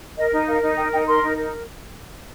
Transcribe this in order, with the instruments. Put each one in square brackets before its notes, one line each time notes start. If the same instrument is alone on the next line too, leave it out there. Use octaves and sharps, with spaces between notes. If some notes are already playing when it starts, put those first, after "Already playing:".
[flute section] A#4 D#5
D#4
A#4 F5
D#4
A#4 G5
D#4 G5
A#4 C6
D#4
A#4